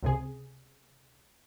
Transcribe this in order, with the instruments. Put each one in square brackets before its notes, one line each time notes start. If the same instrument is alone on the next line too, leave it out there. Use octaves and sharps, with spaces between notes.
[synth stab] C#2 C3 G#4